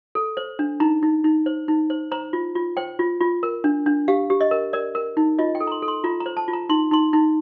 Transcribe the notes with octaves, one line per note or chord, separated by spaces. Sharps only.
A4
C5
D4
D#4 A#5
D#4
D#4
C5
D#4
C5
C5 A#5
F4
F4
C5 G5
F4
F4
A#4
D4
D4
G4 F5
G4
D#5
A#4
A#4 D5
A#4
D#4
F4 D#5
G5
A4
A#5
C6
A4
C6
F4 A#5
A#5
C5
A5
F4
A#5
D#4 C6
D#4 C6
D#4